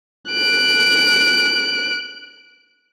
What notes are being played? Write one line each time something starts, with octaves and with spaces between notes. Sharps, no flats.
F#6 D7